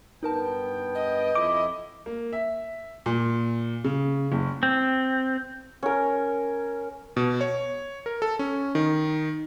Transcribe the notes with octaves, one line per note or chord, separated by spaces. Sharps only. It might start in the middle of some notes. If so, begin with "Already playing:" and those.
G2 B3 D#4 A#4 G5 A5
D#5
F2 E4 D6
A#3
E5
A#2
C#3
F#1
C4
C#4 A#4
B2
C#5
A#4
A4
C#4
D#3